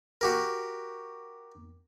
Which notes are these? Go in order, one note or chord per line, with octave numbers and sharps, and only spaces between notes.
F#4 G4 A#4